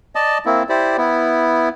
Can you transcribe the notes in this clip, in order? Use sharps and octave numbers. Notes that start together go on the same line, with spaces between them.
D5 D#5 A5
A#3 C4 E4
E4 G4 C5 D5
B3 E4